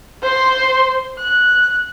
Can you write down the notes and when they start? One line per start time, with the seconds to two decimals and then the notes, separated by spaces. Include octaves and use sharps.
0.23 C5 C6
1.19 F#6